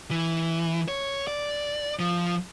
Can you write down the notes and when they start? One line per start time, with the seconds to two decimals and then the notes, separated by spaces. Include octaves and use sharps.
0.11 E3
0.88 C#5
1.28 D5
1.99 F3